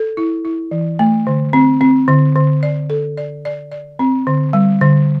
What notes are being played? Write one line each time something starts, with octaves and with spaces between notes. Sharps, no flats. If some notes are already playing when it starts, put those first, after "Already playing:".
Already playing: A4
E4
E4
E3
A3
D3
C4
C4
D3
D3
D5
A4
D5
D5
D5
C4
D3
G3
D3